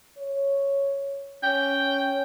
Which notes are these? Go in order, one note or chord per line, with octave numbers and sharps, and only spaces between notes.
C#5
C#4 G5